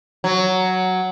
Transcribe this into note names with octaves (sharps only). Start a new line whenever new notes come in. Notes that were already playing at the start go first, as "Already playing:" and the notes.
F#3